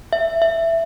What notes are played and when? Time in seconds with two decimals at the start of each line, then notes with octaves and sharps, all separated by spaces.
0.13 E5
0.42 E5